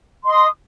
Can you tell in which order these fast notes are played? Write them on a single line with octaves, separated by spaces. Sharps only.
C6 D#5 D#6